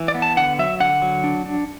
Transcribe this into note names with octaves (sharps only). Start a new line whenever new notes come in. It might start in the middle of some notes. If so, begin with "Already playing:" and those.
Already playing: E3
D5
B3
A5
D3 F#5
F#3 E5
D3 F#5
F#3
D4
D4